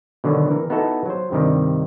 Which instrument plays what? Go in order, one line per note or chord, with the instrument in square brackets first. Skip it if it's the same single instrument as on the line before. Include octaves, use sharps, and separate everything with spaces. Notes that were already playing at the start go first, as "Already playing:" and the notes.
[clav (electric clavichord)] B2 D3 D#3 F#3
E3 A#4
B3 D#4 E4 F#4 A4
F#3 C5
G2 C3 D#3 G3